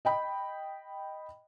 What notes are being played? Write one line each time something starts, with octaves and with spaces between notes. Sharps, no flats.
D#5 G5 B5